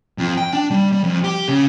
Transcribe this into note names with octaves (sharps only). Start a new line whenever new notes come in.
F2
G5
D4
G3
G3
F2
G4
C#3